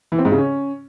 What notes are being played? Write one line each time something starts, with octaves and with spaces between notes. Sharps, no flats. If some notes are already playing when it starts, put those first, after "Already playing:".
E3
C4
G#2
C#3
C#4